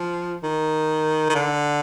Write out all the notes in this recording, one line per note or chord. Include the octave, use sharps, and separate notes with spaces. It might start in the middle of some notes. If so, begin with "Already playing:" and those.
Already playing: F3
D#3
D#3
D3